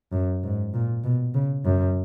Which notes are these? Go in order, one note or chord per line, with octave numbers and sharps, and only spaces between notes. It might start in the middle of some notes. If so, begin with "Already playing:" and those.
F#2
G#2
A#2
B2
C#3
F#2